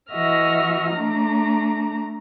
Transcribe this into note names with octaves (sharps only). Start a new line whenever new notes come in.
E3 F#4 D#5 E5 F6 A#6
A3 D4 A#5